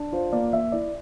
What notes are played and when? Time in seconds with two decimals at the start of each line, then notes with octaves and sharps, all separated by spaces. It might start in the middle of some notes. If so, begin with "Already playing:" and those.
Already playing: D4
0.12 F4 C5
0.32 A#3 D5
0.53 A#3 E5
0.72 E4 D5